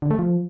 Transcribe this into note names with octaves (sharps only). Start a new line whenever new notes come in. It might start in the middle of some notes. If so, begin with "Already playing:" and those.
D3
A3
F3